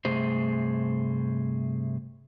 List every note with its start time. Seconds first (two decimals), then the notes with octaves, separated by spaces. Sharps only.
0.05 G2 C3 A3 G#4 C5